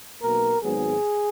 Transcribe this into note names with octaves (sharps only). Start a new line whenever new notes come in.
B1 B2 A#3 A#4
G#1 G#2 F#3 B3 G#4